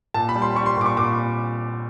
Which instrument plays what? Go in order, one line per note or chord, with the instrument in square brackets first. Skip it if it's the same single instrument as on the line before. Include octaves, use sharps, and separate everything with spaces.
[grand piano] A#2 A5
B5
G3
C6
G3 C#6
C6
A#2 D6
C#6
A#2 D6